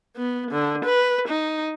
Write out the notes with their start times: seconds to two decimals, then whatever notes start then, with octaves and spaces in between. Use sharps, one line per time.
0.18 B3
0.52 D3
0.85 B4
1.29 D#4